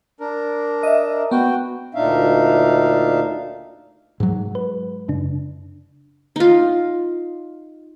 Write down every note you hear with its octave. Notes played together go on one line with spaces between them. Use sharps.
D4 A#4
D#5 E5
B3 F#4 G5
D2 A#2 D4 D#4 E5 F5
G#2 F#3
B4
F#2 C#3 D4
D#4 F4